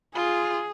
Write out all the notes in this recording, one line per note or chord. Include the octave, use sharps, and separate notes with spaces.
F4 G#4